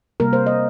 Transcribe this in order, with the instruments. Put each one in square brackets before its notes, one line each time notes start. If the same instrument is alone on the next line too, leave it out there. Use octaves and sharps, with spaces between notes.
[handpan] C3 G3 A#3 A#4
C5
D#5